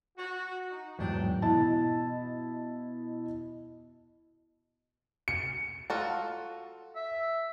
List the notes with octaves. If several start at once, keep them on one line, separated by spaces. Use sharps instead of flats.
F#4
D#4
E2 G#2 F#3 D4 F#4 G5
B2 E4 D#5 A5
C#7
F4 F#4 A4
E5